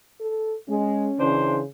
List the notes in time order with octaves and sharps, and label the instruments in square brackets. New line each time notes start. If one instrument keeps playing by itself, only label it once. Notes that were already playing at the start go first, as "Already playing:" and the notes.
[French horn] A4
[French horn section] G#3 [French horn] C#4
[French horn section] C#3 [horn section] E3 D4 C5